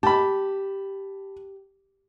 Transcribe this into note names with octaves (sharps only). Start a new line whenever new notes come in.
G4 A5 B5